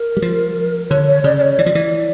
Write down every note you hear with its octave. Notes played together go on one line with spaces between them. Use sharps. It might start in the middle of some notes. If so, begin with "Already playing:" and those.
Already playing: A#4
G3
F3
D3 C#5
C#5
C#3 D5
D5
C#5
E3 D5
F3
E3